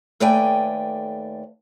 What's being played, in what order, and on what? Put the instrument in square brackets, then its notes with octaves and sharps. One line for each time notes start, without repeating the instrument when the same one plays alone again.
[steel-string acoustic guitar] D#2 A3 B4 D5 G5 G#5